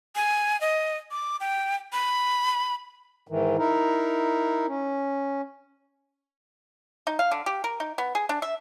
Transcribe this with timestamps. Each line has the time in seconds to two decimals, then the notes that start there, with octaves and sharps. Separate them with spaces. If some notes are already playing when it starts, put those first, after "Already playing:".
0.16 G#5
0.61 D#5
1.11 D6
1.40 G5
1.93 B5
3.28 G#2 D#3 E3
3.58 D#4 E4 A#4
4.67 C#4
7.07 D#4
7.19 F5
7.31 D3
7.46 G4
7.64 A#4
7.80 D#4
7.98 B3
8.15 G#4
8.29 D4
8.42 E5